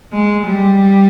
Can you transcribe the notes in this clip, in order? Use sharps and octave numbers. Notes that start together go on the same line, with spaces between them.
G#3
G3